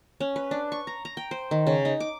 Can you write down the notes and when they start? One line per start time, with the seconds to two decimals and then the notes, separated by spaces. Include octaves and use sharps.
0.20 C#4
0.36 B4
0.51 D4
0.72 C#6
0.87 A#5
1.05 A#5
1.17 G5
1.31 C5
1.51 D#3
1.67 C#3
1.85 D#4
2.00 D6